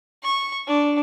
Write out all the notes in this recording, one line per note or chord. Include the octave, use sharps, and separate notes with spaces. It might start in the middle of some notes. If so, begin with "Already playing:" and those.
C#6
D4